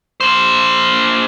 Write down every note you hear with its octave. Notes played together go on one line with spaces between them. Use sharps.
A#3 C5